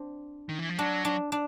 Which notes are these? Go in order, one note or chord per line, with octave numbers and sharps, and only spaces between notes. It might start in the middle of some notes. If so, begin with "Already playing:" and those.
Already playing: C4 D4
D#3
E3
F3
F#3 D4
D4
D4